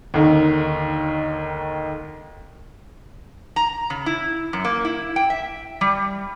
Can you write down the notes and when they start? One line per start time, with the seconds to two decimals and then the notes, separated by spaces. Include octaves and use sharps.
0.14 D#2 D3 D#3
3.56 A#5
3.90 C#3
4.06 E4
4.53 F#2
4.64 A#3
4.85 E4
5.16 G5
5.30 E5
5.81 G3